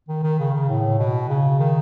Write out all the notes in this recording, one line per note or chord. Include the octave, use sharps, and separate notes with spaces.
D#3
D#3
C#3
C#3
A2
B2
C#3
D#3